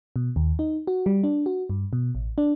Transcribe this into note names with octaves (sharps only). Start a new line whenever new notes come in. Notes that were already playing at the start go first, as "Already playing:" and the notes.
B2
D#2
D#4
F#4
G3
D4
F#4
G2
B2
A1
D4